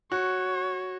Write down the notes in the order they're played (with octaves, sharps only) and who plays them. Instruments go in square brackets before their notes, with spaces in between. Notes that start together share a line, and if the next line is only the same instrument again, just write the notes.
[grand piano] F#4 [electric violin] C#5